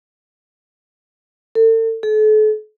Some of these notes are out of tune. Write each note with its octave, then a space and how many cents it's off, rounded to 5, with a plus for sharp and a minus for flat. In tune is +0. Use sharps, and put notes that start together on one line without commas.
A4 +40
A4 -40